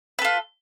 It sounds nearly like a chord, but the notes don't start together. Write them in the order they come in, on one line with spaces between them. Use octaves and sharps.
B4 A4 F4